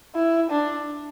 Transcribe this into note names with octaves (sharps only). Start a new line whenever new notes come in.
E4
D4